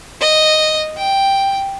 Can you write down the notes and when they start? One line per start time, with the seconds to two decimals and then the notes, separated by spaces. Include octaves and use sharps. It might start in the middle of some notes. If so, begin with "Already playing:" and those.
0.21 D#5
0.97 G5